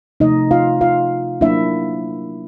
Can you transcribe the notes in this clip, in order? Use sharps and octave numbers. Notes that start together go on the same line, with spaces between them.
C3 F3 A3 D#4 D#5
F4 F5
F4 F5
F#3 A#3 D4 E4 E5